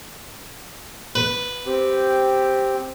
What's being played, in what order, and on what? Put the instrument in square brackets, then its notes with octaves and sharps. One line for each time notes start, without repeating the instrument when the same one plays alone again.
[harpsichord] B4
[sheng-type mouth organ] C4 G4